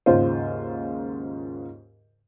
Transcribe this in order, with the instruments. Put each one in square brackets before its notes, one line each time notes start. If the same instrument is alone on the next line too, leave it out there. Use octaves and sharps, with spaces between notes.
[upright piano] D#2 G#2 C#3 F4 C5